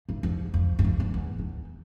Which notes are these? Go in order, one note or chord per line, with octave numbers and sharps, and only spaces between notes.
G2
F2
F2
F#2
F2
E2
E2
E2